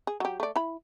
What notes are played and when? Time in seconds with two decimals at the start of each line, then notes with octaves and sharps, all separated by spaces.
0.07 G#4
0.20 F#3 G4
0.40 A3 D5
0.56 E4 B5